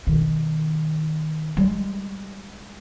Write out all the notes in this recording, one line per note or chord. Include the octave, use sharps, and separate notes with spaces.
B2 D#3
G3 G#3